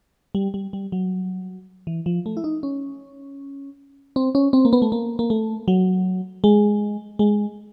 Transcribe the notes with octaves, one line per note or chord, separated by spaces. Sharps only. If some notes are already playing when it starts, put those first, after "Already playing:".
G3
G3
G3
F#3
E3
F3
A3
E4
D#4
C#4
C4
C#4
C4
A#3
B3
A3
A#3
A#3
A3
F#3
G#3
G#3